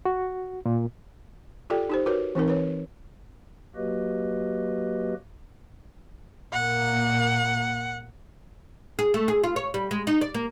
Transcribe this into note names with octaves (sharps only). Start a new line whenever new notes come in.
F#4
A#2
F4 G4 A4 D5 G5
D#4 G4 C5
F#4 A#4 B4 C#5
E3 C4 D#4 A#4
B4 C#5
F#3 A#3 F#4 G4 B4 D#5
A#2 A#3 F#5
G#4
A3
G#4
F4
C#5
G3
G#3
D#4
D5
A#3